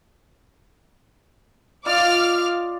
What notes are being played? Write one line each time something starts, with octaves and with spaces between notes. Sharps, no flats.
F4 D5 D#5 F5 D6 F6